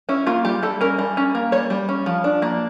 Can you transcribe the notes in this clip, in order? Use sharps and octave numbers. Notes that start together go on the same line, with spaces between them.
C#4 E4
A#3 F4
G3 G4
G3 A4
C#4 A#4
G3
C#4
A#3
G3 C#5
G3
C#4
F3
D4
A#3